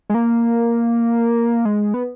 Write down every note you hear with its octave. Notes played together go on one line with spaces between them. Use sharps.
G#3
A#3
G#3
B3